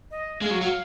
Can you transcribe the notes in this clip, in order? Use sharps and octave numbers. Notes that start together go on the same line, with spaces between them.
D#5
G#3 F5
F#3
F#3